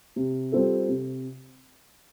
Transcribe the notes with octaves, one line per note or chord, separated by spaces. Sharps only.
C3
G3 C4 F4 A4
C3